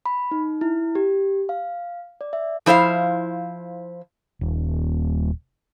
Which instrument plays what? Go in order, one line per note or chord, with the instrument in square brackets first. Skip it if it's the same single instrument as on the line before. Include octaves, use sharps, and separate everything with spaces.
[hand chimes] B5
D#4
E4
G4
F5
D5
E5
[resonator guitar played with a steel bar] F3 E4 C5 E5 F5
[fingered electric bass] D#1